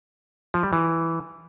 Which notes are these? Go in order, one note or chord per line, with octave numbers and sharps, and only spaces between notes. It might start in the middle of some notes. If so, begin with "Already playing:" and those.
F3
G3
E3